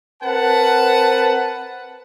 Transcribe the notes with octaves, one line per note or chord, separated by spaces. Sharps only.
C4 A#4 B4 F#5 A5